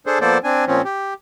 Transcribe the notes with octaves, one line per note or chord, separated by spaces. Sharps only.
D4 G#4 A4 C5
F3 A#3 B3 A4 C5 D5
C4 D4 G#5
A#2 F3 C4 C#4
G4